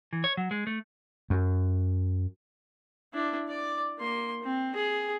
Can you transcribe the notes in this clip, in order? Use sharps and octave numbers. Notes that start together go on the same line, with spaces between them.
E3
C#5
F#3
G#3
A3
F#2
D4 E4
D5 D6
A#3 C6
C4
G#4